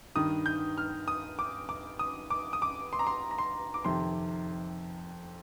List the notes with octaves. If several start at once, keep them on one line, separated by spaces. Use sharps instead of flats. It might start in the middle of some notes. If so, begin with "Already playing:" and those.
G2 D#3 D#6
G6
F6
D#6
D6
D6
D#6
D6
D#6
D6
C6
A#5
C6
A#5
C6
D6
F2 C3 D#3 C6